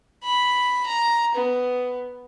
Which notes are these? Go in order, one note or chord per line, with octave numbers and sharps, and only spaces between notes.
B5
A#5
B3